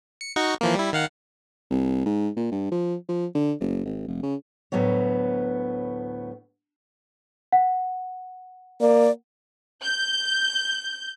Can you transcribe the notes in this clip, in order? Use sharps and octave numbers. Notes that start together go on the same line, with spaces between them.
C#7
D#4 F#4 C#6
E3 F3 A#3
G3 E4
D#3 F5 F#5
C2
G#2
A#2
G2
F3
F3
D3
F#1
G#1
F1
C#3
D2 A2 F#3 B3 C#5
F#5
A#3 D5
G6